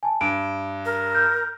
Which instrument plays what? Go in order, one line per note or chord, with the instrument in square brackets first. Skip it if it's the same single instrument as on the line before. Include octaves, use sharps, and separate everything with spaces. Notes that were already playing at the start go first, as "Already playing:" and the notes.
[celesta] G#5 A5
[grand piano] G2 [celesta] D7
[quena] A#4
[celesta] F6 G6